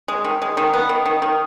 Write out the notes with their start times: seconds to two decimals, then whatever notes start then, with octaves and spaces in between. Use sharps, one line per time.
0.08 G#3
0.24 D#3
0.42 G#3
0.57 D#3
0.74 B3
0.89 D#3
1.06 D#3
1.22 D#3